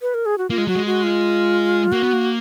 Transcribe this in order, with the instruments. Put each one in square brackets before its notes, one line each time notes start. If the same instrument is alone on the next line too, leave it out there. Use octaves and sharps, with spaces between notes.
[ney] B4
A#4
G#4
F#4
[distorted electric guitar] A#3 [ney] F4
[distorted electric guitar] G#3
[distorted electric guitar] F#3 [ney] F#4
[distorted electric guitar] G#3
[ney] F#4
F4
[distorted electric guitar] A#3 [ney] F#4
[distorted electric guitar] B3
A#3